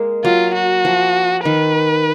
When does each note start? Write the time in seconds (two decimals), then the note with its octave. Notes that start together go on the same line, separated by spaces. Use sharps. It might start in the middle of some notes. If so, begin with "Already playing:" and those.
Already playing: G#3 A#3
0.24 F#3 F4
0.54 F#4
0.85 F3
1.45 D#3 B4